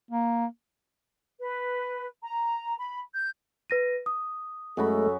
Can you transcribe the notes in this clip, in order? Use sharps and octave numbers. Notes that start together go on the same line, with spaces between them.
A#3
B4
A#5
B5
G6
B4 A#6 D#7
D#6
F#2 G#3 A3 F#4 A4 B5